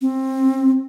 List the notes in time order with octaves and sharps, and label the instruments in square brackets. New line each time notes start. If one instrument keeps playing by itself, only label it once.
[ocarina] C4